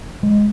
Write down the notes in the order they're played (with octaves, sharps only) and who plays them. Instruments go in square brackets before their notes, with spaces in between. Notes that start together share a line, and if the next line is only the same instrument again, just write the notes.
[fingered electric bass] G#3